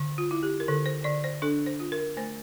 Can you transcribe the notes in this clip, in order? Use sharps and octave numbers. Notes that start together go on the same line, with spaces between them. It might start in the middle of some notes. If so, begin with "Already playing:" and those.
Already playing: D3
F4
E4
G4
A#4
D3 A4
C5
D3 D5
C5
D4 A4
C5
F4
A#4
A3 C5